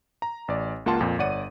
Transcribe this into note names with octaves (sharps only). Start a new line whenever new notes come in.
A#5
A1 D5
C#2 A#3 F4 F#5 A5 C6
F2 A#2
G1 C#5 D5 F#5 D#7